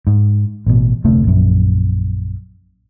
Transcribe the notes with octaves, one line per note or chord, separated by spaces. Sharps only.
G#2
A1 B2
F1 D2 C3 A3
A#1 F#2